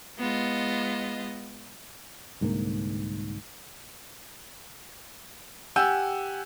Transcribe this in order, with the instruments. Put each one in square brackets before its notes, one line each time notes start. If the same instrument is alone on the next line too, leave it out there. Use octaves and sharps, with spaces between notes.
[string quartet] G#3 B3 F4 D#5
[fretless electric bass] C2 G#2 D3 A#3
[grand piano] G4 F#5 G#5 E6 G6